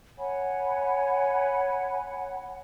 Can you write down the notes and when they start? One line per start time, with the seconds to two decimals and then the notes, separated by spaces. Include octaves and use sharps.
0.18 C#5 F#5 G#5 B5